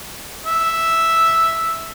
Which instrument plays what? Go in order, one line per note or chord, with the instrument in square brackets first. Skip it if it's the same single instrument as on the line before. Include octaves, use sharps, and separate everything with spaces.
[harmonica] E5